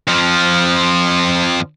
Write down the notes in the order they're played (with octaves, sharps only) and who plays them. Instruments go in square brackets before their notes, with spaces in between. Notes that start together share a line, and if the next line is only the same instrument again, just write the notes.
[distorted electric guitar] F2 F3